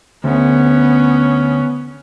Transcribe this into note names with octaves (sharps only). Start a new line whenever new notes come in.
D2 B3 C#4